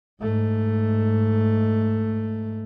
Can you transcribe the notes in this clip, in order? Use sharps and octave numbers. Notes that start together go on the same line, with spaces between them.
G#2 A3